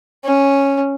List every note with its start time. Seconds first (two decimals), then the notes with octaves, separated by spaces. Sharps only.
0.25 C#4